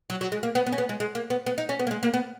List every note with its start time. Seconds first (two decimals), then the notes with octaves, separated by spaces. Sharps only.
0.10 F#3
0.21 F#3
0.32 G#3
0.43 A#3
0.55 B3
0.66 B3
0.72 C#4
0.78 B3
0.89 G#3
1.00 G#3
1.15 A#3
1.30 B3
1.46 B3
1.58 D#4
1.69 C#4
1.79 B3
1.87 A#3
1.91 G#3
2.03 A#3
2.14 B3